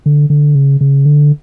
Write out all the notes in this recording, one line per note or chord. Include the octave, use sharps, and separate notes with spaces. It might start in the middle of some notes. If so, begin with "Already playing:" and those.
D3
D3
C#3
C#3
D3